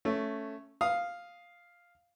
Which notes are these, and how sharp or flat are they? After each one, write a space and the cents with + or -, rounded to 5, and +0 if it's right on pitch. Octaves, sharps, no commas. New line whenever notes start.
A3 +0 C#4 +0
F5 +0 D#6 +0